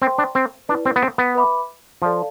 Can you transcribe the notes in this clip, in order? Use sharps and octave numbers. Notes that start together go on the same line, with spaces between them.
C4 C5 G5 C6
D4
C4
D4 E4 B4 D5
C4
B3
C4
B3
B4 E5 B5 D6
F3 A4 D5 F5 A5